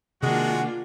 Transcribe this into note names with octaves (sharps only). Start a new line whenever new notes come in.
C3 D#3 G#3 A#3 D4 F4 F#4 F#5